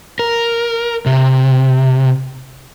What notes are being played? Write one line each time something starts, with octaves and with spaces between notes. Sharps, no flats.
A#4
C3